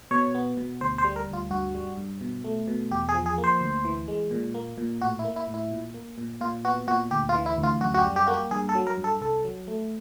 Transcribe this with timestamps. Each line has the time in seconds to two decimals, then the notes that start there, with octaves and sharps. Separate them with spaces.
0.11 B2 C#5
0.34 B3
0.57 B2
0.81 D2 C5
0.98 C5
1.04 G3
1.16 A#4
1.28 D2
1.33 F4
1.51 G2 F#4
1.75 G3
1.98 G2
2.21 B2
2.44 A3
2.68 B2
2.91 E2 G4
3.09 G#4
3.14 F3
3.26 G#4
3.38 A#3
3.44 C5
3.61 D2
3.85 E3
4.08 G#3
4.31 A#2
4.54 A#3
4.78 A#2
5.01 A2 F#4
5.19 E4
5.24 A#3
5.36 E4
5.48 A2
5.54 E4
5.71 A#2
5.94 A#3
6.18 A#2
6.41 A#2 F4
6.65 B3 F#4
6.88 A#2 F#4
7.11 D2 G4
7.29 F4
7.35 E3
7.46 E4
7.58 D2
7.63 F4
7.81 F#2 F#4
7.94 F#4
7.98 G4
8.05 G3
8.16 G4
8.27 A#3 F#4
8.34 G4
8.51 G2 G#4
8.69 A4
8.75 F#3
8.87 A#4
8.97 G2
9.04 A4
9.21 C2 A4
9.45 F#3
9.68 A3